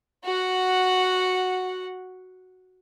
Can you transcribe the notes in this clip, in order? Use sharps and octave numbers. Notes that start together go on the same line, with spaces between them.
F#4 F#5